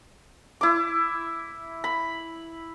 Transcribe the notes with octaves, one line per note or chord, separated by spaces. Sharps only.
E4 D6
B5